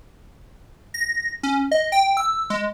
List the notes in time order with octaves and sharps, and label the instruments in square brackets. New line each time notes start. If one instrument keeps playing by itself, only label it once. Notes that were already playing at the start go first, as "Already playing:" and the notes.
[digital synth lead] A#6
C#4
D#5
G5
E6
G#3